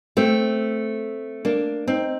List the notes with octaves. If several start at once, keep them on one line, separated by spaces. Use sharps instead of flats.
A3 C4
A#3 D4
C4 D#4